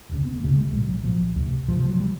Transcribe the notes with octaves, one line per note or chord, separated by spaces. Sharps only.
E1 D2 C#3
B3
E1 D2 C#3 A#3
G#3
B1 A#2 G#3
F#3
B1 A#2 F3
D2 C3
D2 C3 F3
F3
F#3
G3